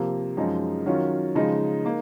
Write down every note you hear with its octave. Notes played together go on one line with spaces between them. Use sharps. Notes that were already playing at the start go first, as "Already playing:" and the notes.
Already playing: C3 F3 A#3
F#2 F3 G#3 D#4
D#3 F#3 C#4 F4
C#3 F3 G#3 D#4
A#3 D#4